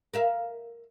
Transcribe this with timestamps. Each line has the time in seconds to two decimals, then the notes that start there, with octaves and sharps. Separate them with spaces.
0.14 A#4 E5 F5